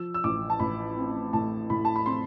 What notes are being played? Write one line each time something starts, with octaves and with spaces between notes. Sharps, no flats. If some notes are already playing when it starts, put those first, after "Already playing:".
Already playing: F3 E6
E6
A1 D6
A5
A1 B5
C4
A2 A5
A2 B5
A5
B5
C4 C6